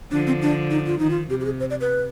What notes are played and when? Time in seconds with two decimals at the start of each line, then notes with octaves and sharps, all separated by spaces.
0.11 D3 F3 D4
0.27 C4
0.42 D4
0.71 D#4
0.87 F4
0.99 D#3 D#4
1.10 F4
1.30 C3 G4
1.41 G4
1.45 G#4
1.60 C5
1.70 D5
1.81 B4